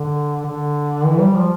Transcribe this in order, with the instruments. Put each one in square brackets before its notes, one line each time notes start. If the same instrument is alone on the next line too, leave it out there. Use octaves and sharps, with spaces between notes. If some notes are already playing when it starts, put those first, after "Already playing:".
Already playing: [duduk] D3
D3
E3
G3
F3